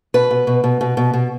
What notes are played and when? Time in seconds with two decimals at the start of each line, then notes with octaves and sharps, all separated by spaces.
0.14 B2 B4
0.31 B2
0.47 B2
0.64 B2
0.81 B2
0.97 B2
1.13 B2